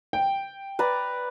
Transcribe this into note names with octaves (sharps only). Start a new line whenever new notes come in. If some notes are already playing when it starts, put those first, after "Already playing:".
G5
B4 D5 A#5